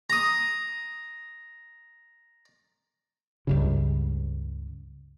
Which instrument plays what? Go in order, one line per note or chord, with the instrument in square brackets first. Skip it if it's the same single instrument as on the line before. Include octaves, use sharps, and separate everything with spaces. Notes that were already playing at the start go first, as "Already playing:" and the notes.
[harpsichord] A#5 D#6
[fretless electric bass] C#2 G2 C#3